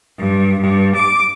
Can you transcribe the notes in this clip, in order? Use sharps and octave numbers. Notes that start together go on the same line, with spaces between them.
G2
G2
D6